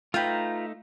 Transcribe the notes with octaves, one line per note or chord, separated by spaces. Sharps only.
A3 D#4 F4 B4 F5 G5 A#5